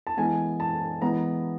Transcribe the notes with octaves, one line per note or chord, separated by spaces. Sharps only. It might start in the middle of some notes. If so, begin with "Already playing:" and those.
A5
E3 G#3 B3 G#5
A5
E3 G#3 B3 A#5